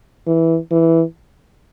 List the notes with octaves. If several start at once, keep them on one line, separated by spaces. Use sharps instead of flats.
E3
E3